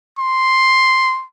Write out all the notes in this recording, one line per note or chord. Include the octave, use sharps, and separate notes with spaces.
C6